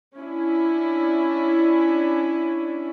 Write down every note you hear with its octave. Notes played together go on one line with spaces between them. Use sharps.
C#4 D4 E4